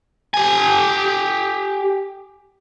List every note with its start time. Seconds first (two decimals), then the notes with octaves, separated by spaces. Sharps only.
0.34 G4 G#5